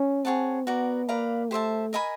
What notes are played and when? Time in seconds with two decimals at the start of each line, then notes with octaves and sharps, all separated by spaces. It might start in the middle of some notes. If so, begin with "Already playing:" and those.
Already playing: C#4
0.24 C4 G#4 C#5 F#5 A5
0.66 B3 F#4 A#4 D5
1.09 A#3 B4 D5 F5 A#5
1.51 A3 G4 C5 E5 A5
1.93 A#4 D#5 G#5 B5